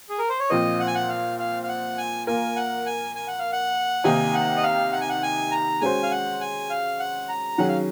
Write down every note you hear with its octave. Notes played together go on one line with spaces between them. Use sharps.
G#4
A#4
C5
C#5
A#2 F3 C4 F4 C5 D#5
F#5
G#5
F#5
F5
F5
F5
F#5
G#5
A#3 F4 A#4 G#5
F#5
G#5
G#5
F#5
F5
F#5
C3 D#3 A#3 D#4 G#5
F#5
D#5
F5
F#5
G#5
F#5
G#5
A#5
G#3 C#4 F#4 C5 G#5
F5
F#5
G#5
F5
F#5
A#5
D#3 F#3 C#4 G#4 F#5
F5